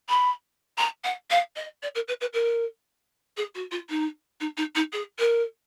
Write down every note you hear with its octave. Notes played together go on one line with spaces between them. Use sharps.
B5
A#5
F#5
F5
D#5
D5
A#4
B4
B4
A#4
G#4
F#4
F4
D#4
D#4
D#4
D#4
G#4
A#4